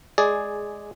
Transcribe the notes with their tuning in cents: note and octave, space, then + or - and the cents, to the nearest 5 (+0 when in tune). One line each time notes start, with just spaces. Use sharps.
G#3 +10 G#4 +0 D5 +0